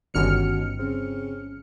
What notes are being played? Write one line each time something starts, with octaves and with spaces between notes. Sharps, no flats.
G1 B2 D3 D#3 C#4 F6 C#7
C#3 C4